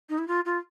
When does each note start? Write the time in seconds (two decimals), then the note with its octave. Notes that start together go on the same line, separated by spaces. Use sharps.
0.09 D#4
0.18 E4
0.28 F4
0.45 F4